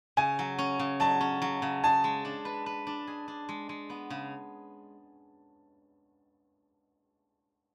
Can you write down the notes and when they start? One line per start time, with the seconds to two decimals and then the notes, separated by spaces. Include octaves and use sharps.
0.17 C#3 G#5
0.39 F#3
0.59 C#4
0.79 C#3
1.00 F#3 A5
1.21 C#4
1.42 F#3
1.62 C#3
1.84 G#4 A5
2.04 G#3
2.25 D4
2.45 B4
2.66 B4
2.87 D4
3.07 G#4
3.28 D4
3.49 G#3
3.69 G#3
3.90 B3
4.10 C#3